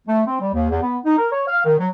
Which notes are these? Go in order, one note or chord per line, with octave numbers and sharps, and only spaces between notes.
A3
C4
G3
D#2
E2
B3
D#4
A#4
C#5
F5
D#3
F#3